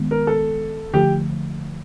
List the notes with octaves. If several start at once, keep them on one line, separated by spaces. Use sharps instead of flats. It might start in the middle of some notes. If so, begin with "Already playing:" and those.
Already playing: D#3 G#3 B3
A#4
A4
D3 F3 A3 G4